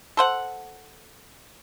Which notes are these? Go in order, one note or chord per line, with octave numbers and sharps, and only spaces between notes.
A4 C5 F#5